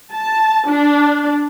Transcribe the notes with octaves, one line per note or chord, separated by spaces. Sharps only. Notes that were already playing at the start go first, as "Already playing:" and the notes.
A5
D4